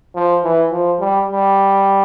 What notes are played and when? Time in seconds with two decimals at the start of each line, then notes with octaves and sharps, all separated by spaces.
0.15 F3
0.44 E3
0.71 F3
1.00 G3
1.28 G3